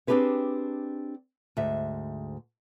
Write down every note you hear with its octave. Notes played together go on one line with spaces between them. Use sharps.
C4 D4 G4 G#4 B4 C#5
D2 G#2 E5